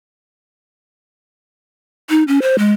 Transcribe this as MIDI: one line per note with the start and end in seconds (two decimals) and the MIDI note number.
2.10 2.23 63
2.28 2.39 61
2.42 2.56 72
2.58 2.73 56